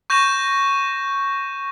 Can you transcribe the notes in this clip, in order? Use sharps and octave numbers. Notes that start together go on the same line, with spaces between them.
C#6 G6 A#6 D#7 E7